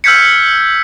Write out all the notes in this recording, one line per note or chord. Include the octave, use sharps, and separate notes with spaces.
E6 F6 G6 G#6 B6 C#7